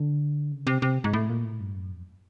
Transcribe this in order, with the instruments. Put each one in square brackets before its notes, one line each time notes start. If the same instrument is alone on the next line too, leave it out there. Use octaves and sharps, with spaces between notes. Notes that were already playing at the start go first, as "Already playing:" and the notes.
Already playing: [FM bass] D3
C#3
C3
C3
G#2
A2
A#2
A2
G2
F#2
F2